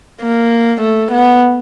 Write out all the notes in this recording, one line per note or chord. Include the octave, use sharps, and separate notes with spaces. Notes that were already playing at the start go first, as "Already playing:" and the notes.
A#3
A3
B3